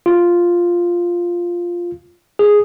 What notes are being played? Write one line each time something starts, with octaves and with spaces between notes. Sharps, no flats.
F4
G#4